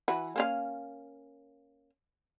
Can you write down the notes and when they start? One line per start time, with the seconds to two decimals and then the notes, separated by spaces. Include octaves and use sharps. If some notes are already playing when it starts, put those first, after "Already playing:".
0.08 E3 F#4 B4
0.36 A#3 C#4 F5